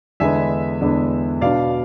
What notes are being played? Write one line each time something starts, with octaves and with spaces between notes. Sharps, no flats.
E2 D3 G#3 B3 D4 E5 G#5
E2 D3 G#3 B3 D4
B2 B3 D4 D5 F5